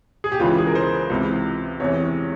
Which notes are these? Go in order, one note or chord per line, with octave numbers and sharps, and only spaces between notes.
G#4
G4
C#2 C#3 E3 F4
G#4
A#4
C5
C#2 C3 E3
E2 C3 E3 C#5